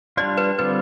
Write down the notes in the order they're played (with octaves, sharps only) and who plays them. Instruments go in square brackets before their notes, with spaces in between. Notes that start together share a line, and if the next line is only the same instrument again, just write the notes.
[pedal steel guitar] G3 D4 F4 [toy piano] D5
[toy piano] B4
[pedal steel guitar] D3 G3 C4 F4 [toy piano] B4